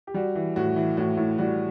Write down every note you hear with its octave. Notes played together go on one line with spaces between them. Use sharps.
G4
G3 F#4
E3
A2 F#4
E3
A2 F#4
A2
G3 F#4